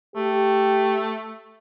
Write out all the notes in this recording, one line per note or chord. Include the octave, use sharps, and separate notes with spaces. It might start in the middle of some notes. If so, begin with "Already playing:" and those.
A3 G4